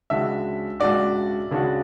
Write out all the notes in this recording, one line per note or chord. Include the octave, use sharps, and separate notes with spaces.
C#2 C#3 G#3 D4 F#4 E5
C#2 C#3 G#3 D4 F#4 D5
C#2 C#3 G#3 D4 F#4